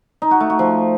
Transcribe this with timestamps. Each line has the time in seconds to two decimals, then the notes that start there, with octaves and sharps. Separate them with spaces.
0.22 D#4
0.31 F#4
0.40 A3
0.50 F#4
0.59 F3